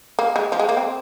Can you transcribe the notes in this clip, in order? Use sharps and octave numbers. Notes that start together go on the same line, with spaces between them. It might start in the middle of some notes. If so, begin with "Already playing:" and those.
A#3
G#3
F3
G#3
A#3
C4